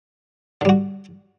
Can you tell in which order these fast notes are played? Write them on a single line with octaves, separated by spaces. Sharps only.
D3 G3 F#4